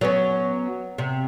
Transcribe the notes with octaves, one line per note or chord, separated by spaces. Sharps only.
F#3 B3 C#4
C3